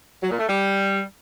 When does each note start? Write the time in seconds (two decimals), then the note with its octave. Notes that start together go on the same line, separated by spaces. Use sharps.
0.22 F#3
0.30 A#2
0.39 A3
0.47 G3